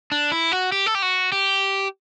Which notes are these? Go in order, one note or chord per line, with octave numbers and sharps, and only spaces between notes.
D4
E4
F#4
G4
A4
G4
F#4
G4